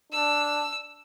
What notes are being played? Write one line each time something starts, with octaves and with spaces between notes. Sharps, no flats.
D4 E6